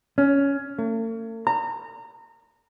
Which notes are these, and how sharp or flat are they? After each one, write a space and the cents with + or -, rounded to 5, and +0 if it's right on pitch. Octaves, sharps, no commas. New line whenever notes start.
C#4 +10
A3 +45
A#5 -25